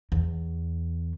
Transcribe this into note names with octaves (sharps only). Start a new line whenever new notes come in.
E2